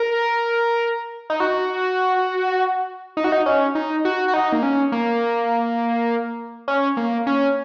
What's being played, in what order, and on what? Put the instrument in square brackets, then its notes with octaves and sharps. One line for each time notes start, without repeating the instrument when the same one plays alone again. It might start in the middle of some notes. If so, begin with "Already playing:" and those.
Already playing: [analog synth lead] A#4
D#4
F#4
D#4
F#4
D#4
C#4
D#4
F#4
F#4
D#4
A#3
C#4
A#3
C#4
A#3
C#4